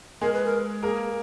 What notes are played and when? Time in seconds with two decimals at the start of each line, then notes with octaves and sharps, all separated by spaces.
0.21 G#3 G#4 A#4
0.33 B4
0.45 A#4
0.83 A#3 G#4 A#4